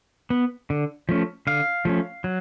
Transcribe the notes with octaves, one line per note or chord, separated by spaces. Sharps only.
B3
D3
F3 A3 C#4
D3 F5
F3 A3 C#4
F#3